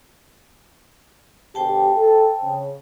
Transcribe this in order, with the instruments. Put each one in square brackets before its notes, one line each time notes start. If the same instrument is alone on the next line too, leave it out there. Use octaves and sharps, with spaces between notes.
[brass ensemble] B2 D3 G4 [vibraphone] C5 G5 A5
[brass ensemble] A4
C#3